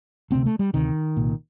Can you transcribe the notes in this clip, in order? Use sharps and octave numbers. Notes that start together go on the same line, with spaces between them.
D2 C3 C4
A3
G3
D2 C3 D#3
C2 A#2